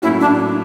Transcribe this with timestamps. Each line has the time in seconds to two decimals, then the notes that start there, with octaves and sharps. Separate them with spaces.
0.02 A2 F#3 A#3 C#4 E4 F#4
0.21 D4